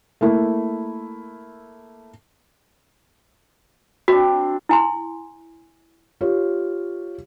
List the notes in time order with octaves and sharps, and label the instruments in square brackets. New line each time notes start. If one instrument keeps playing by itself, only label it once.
[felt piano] A3 A#3 E4
[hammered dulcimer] C4 D4 [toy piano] F#4
[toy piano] E4 G#5 C6
[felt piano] F4 G4 C#5